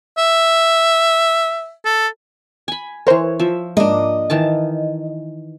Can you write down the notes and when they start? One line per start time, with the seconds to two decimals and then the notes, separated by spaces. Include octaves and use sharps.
0.18 E5
1.85 A4
2.68 G#5 B5
3.07 E3 A#4 C5 C#5
3.40 F3 E5
3.77 G#2 A#3 D4 D#5
4.30 D#3 E3 A5